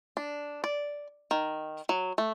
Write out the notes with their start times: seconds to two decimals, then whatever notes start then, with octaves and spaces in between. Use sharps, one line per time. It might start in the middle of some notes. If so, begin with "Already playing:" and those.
0.17 D4
0.64 D5
1.31 D#3
1.89 F#3
2.18 A3